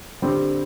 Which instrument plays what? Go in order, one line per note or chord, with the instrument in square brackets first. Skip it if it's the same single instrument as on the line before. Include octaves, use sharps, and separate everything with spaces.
[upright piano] D3 G3 C4 G4